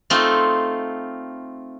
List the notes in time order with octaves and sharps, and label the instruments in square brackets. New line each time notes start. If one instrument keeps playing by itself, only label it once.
[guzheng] A3 C4 D#4 F4